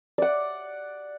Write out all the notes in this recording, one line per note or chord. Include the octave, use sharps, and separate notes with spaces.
D5 F#5